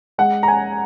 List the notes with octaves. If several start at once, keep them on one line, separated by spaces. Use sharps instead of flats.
G#3 F#5
A#5
G#5